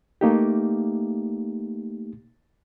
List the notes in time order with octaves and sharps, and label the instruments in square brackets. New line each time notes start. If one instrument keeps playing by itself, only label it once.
[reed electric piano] A3 A#3 D#4 G4